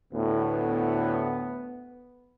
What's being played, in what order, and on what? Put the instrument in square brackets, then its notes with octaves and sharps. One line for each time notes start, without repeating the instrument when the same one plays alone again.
[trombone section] D2 A2 [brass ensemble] B3